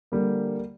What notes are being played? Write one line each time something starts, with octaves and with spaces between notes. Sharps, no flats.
D3 G3 A#3